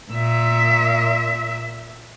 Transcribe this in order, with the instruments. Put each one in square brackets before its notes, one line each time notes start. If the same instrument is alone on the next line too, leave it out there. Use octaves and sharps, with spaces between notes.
[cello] A#2 E5